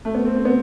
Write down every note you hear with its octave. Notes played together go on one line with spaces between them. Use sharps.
A3
B3
C4
C4
B3